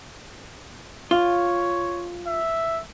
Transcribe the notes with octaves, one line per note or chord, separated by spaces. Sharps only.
F4 C#5
E5